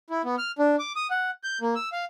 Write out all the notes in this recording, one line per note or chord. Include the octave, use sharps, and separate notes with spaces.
E4
B3
F6
D4
D6
D#6
F#5
G6
A#3
E6
F5